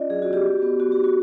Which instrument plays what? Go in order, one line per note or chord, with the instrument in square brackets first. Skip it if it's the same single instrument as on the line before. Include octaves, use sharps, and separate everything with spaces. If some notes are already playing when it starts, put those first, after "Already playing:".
Already playing: [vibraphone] C#4 D4 F4 D5 D#5
F#3 G#4
F#4
B3
G4
F#4
B3
B3 F#4
G4
D#4
F#4